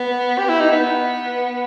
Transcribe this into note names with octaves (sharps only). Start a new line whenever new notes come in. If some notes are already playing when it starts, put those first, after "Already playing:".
Already playing: B3
G4
E4
D#4
B3